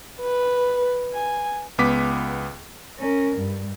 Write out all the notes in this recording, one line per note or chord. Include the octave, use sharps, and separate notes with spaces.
B4
G#5
C#2 B3 D6 B6
C#4 A#4
G2